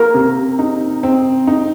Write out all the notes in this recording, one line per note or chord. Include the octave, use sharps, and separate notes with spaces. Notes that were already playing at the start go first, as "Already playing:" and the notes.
Already playing: A#3 A#4
C3
D#4
C4
D#4